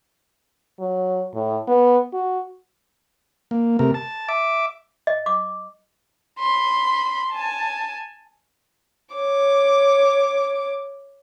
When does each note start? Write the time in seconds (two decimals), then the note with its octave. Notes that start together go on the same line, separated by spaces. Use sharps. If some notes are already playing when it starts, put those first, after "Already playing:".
0.80 F#3
1.34 A2
1.68 B3
2.13 F#4
3.51 A#3
3.79 C3 A3 A#4
3.94 A5
4.29 E5 D6
5.07 D#5
5.26 D6
6.39 B5 C6
7.32 G#5 A5
9.15 C#5 D6